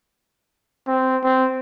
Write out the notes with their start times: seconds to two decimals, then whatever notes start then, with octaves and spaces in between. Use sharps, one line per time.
0.87 C4
1.23 C4